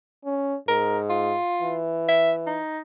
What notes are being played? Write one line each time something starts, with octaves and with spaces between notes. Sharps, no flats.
C#4
G#2 A#4
F4
E3
E5
D#4